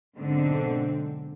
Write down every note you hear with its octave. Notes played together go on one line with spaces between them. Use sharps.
B1 G#2 D3 C4